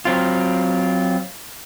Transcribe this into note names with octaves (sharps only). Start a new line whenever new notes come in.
F#3 C4 F4